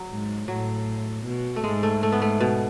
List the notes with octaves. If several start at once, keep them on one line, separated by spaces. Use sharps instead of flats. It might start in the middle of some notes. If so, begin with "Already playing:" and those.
Already playing: F#3
G#2
A2 F#3
B2
A3
G#2 G#3
A3
A3
B3
A3
B2